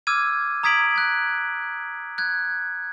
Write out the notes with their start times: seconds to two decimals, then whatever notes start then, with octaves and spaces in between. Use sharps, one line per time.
0.07 D6 E6 F6 G#6 D#7
0.63 A#5 D#6 G#6 B6 D7 F#7
0.96 F#6 G#6
2.18 F#6 G#6